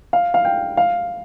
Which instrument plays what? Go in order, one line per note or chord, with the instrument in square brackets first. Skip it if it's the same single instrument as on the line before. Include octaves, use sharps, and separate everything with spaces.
[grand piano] F5
F5
G5
F5